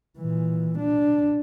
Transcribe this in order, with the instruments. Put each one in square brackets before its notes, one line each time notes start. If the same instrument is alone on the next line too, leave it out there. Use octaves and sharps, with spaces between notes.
[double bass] A#2 E3
D4